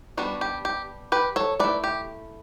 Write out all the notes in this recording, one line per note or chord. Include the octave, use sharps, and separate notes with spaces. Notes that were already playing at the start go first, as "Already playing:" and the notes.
G3 B3 D4 F#4
G4
G4
G4 B4
A4 C#5
A3 E4 B4 D5
G4